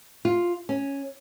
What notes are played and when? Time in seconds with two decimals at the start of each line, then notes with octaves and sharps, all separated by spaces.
0.25 F4
0.69 C#4